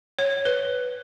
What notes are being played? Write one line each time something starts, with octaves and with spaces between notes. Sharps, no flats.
C#5
B4